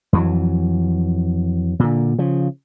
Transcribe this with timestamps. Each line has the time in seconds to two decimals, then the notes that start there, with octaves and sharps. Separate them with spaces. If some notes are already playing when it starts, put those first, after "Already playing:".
0.13 F2 E3 F#3
1.79 A#2 D3
2.19 C#3 F3